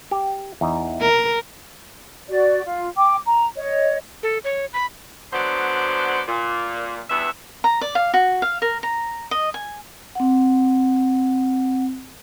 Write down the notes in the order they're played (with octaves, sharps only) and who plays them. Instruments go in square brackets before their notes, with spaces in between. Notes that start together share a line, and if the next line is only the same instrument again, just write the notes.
[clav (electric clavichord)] G4
E2 D#4
[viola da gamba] A#4
[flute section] F#4 D5
F4
G5 D6
A#5
C#5 D#5
[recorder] A4
C#5
B5
[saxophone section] D3 F#3 B3 C5 D5
A#2
E2 G2 B3 E5
[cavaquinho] A#5
D5
F5
F#4
F5
A#4
A#5
D#5
G#5
[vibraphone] C4 F#5